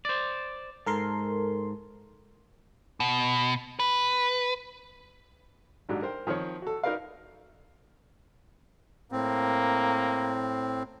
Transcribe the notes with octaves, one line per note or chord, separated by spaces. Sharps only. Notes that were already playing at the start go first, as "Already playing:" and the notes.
C5 D5
G#2 A4 A#4 C6
B2
B4
G#1 G#2 F#3 D4 G4
A#4 C5 G5
D#3 F3 C4 C#5
F#4 A4
D#4 F#4 A#4 B4 D5 F5
A2 A#3 C4